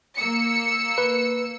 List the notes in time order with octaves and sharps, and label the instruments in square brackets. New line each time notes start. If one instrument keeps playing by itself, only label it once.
[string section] A#3 E6 C#7
[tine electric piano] B4